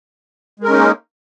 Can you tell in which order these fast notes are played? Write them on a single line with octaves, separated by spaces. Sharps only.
G#3 A#4 C#4 D#4 A#3